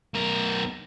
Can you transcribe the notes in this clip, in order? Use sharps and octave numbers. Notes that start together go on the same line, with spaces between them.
B1 A#4